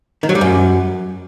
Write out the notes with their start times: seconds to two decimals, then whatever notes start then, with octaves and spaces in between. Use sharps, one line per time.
0.23 D#3
0.29 F#3
0.35 G3
0.41 F#2